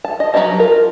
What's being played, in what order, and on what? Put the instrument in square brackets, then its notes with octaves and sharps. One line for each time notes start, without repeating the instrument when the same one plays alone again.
[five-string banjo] A5
D#5
F#3 F4 G4 D#5 A5
F4 A#4